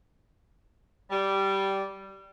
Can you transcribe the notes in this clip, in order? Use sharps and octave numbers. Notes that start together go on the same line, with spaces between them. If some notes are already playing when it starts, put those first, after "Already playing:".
G3